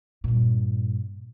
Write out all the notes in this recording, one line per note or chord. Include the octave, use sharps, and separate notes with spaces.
G2 A#2